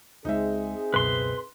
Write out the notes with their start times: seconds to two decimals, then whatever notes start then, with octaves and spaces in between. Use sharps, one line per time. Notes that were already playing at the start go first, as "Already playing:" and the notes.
0.25 C#2 G#3 C4 D#4 G#4 E5
0.94 C#2 F#2 B2 B4 C6